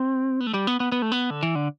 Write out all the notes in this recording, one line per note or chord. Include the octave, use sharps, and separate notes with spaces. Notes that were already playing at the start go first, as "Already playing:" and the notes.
Already playing: C4
B3
A3
G3
B3
B3
B3
A3
B3
D3
E3
D3